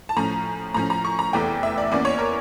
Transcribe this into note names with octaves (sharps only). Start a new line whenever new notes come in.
A5
A2 F3 C#4 A#5
A2 F3 C#4 A#5
A#5
C#6
A#5
F1 E2 E3 A3 G5
E5
D5
E2 E3 A#3 C#4 D5
C#5
A#4